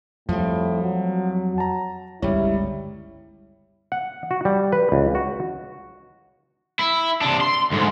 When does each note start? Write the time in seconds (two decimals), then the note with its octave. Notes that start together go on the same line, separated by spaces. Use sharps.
0.29 F2 A2 F3 G3
0.82 F#3
1.58 A5 A#5
2.22 G1 C#2 G3 E4 C#5
3.92 F#5
4.31 F#4
4.45 G3
4.72 B4
4.92 C#2
5.15 F#4
6.79 E4
7.21 C3 D4
7.41 C6
7.72 D2 G#2